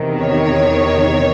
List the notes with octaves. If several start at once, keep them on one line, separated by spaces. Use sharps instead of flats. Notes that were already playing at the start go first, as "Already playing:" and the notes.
Already playing: E2 C3 D#3
C#5